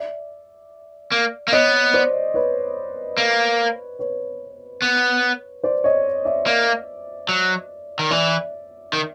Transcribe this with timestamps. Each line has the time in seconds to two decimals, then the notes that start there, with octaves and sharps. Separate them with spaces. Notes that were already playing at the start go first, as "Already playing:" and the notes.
Already playing: D5 E5
1.12 A#3
1.48 A#3
1.52 B3 C#5 D#5
1.93 C5 D5
2.34 B4 C#5
3.18 A#3
3.99 B4 C#5
4.82 B3
5.64 C5 D5
5.84 C#5 D#5
6.25 D5 E5
6.46 A#3
7.29 F#3
7.99 D#3
8.11 E3 D5 E5
8.93 D#3